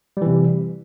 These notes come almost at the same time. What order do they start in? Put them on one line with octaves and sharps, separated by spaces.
G3 E3 C3